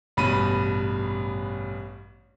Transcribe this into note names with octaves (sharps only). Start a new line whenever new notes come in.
A1 G2 B2 B5 D#7